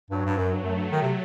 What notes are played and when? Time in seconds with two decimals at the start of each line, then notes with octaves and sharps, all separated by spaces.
0.10 G2 F#3
0.26 G2
0.37 F#2
0.53 G2
0.63 F#2 A3
0.76 G2
0.91 D#3
1.02 C3